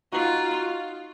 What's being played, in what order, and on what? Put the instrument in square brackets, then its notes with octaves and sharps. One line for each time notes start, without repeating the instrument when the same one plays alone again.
[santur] D#4 F#4 [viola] F4